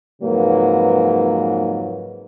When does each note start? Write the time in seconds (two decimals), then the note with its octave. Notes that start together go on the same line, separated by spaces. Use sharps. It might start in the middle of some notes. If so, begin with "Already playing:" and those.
0.22 F2 G#2 C#3 F#3 A#3 B4